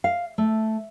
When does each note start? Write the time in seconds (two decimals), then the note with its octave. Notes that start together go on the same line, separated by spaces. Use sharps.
0.04 F5
0.38 A3